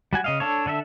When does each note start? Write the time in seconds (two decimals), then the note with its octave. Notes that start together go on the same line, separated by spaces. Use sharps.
0.13 G3 F#4 G#5
0.24 C#3 D#5 F5
0.40 D4 A4 C#5
0.66 D3 D4 A4 E5